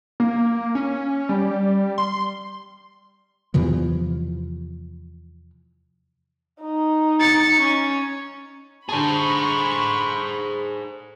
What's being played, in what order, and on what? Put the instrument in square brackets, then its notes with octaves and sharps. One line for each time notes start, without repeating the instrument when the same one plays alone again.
[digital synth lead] A#3
C#4
G3
C6
[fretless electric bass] E2 C3 E3 F3
[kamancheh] D#4
[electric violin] A6 C#7
C#4
[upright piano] D3 A5 [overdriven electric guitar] G#4 C5 [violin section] B5 C#6